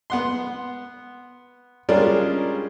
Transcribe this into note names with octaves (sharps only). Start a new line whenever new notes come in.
B3 F#5 C6
G3 G#3 C#4 D4 F4 A#4